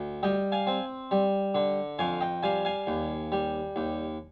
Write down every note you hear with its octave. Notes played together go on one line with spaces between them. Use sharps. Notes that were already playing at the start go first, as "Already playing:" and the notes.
Already playing: D2
G3 D#5 G5
F5 G#5
C4
G3
D3
F2 F5 G#5
D#5 G5
G3 F5 G#5
F5 G#5
D#2
G3
D#2